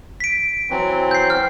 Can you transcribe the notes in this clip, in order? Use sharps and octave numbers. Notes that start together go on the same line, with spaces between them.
B6 D7
E3 F#3 C4
G6 C7
F6